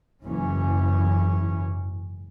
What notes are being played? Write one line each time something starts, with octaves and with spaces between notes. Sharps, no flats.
F#1 G#2 E3 C#4